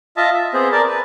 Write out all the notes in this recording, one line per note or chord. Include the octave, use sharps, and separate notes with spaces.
F4 D#5 E5 A5
E5
B3 C4 G#4 C5
A#4 D5 A5
B4